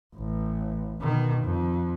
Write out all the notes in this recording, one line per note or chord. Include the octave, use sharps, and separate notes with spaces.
A1
B2 D#3
F2